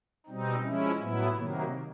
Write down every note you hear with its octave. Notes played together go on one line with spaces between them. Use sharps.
B2 G3 C4 D#4
F3 G#3 C#4 E4
A2 F#3 B3 E4
C3 D#3 F#3 A#3